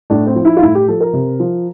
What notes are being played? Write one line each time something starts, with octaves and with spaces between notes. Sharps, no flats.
A2 D4
C4
F3
E4
F4
A2 E4
G4
F3 A4
A#4
C3
F3